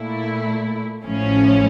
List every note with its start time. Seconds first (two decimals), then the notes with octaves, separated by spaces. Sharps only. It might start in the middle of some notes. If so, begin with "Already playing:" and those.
Already playing: A#2 A3 E4
1.05 A1 A2 F3 C#4